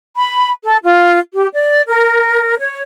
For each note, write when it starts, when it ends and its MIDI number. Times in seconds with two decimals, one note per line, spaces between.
0.17 0.50 83
0.64 0.76 69
0.83 1.18 65
1.34 1.46 67
1.53 1.81 74
1.88 2.58 70
2.59 2.82 73